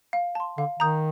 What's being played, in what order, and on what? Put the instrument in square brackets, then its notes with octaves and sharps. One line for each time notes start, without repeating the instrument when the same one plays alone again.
[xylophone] F5
A5 C6
[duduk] D3 [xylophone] F5
[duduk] D#3 [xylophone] A#5 D#6 G6